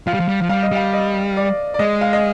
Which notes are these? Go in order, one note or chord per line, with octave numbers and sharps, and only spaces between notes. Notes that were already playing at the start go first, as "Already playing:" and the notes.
F3 F5
G3
F3
G3
F3
G3 F5
D#5
G3 F5
D#5
D5
D5
G#3 D#5
F5
D#5